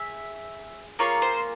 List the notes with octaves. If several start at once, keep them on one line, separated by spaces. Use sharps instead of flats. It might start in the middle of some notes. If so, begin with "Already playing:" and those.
Already playing: G#4 E5
A#3 F4 G#4 C#5
C5